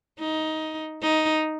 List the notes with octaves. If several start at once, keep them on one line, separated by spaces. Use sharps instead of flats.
D#4
D#4